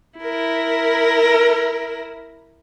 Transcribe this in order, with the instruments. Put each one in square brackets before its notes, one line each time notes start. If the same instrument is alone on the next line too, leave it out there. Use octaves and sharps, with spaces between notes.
[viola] E4 A#4